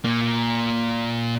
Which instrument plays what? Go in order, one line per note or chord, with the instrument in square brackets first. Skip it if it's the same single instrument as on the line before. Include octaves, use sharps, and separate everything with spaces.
[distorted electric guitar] A#2 A#3